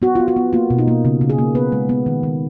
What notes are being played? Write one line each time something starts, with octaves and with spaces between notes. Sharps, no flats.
B3 F#4
B3 F4
F#4
B3
A#3 F4
B2
D#4
A#3
C#3
C#3
G#4
A#3
B3 B4
G#3
B3
D#3
D#3